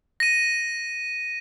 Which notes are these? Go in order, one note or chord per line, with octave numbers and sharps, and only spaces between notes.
A#6 D#7